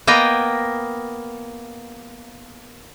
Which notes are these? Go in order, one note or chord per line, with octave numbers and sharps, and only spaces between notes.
A#3 B3 A#4 D#5 G5